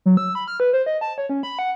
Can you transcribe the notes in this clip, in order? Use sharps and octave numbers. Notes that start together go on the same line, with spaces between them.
F#3
E6
B5
F6
B4
C5
D#5
A5
C#5
C#4
B5
F#5